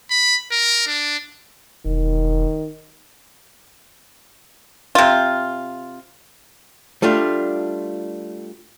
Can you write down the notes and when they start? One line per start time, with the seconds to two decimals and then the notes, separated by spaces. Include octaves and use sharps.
0.10 B5
0.52 A#4
0.87 D4
1.85 E1 D#3
4.95 C3 F4
7.02 G3 A3 D4 F4